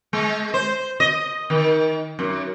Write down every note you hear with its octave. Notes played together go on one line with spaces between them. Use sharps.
G#3
C5
D#5
D#3
F#2